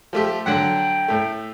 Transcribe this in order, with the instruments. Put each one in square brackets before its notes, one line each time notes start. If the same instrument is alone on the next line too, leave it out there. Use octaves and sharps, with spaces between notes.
[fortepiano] F3 A3 G4
[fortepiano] D3 F#3 F#5 [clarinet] G5
[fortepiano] A2 A3